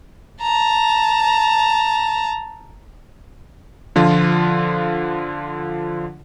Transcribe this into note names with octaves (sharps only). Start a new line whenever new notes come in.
A5 A#5
D3 F3 F4